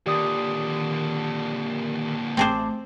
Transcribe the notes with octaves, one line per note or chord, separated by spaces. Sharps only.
A#2 D3 D#3 G4 D5 D#6
A1 A3 C4 G#4 C5 A5 D6